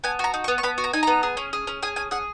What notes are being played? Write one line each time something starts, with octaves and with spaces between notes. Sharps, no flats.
B3 G#5
F#4 A#5
D#4
C#6
B3
C#6
B3 B5
F#4
A#5
D#4 G#5
B3 A#5
G#4
C#4
G#4
C#4
G#4 G#5
C#4 G#5
G#4 F#5